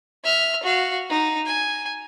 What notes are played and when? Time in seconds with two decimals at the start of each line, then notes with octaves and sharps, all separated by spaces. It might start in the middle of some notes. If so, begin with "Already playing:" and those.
0.24 E5 F6
0.64 F#4 F5
1.10 D#4
1.46 G#5